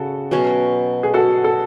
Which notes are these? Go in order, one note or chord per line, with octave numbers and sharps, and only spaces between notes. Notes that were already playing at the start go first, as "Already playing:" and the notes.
Already playing: C#3 F#4 A4
B2 F#3 C#4
G#4
F#4 A4
A4